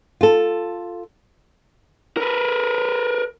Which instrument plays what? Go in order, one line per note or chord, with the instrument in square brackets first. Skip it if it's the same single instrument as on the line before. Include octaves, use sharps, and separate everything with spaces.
[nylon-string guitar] F4 A4
[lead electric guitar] A#4 B4